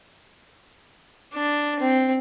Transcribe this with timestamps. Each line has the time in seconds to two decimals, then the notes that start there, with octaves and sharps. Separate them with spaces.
1.33 D4
1.79 C4